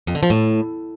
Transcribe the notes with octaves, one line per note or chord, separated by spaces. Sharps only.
F2
D3
F3
A2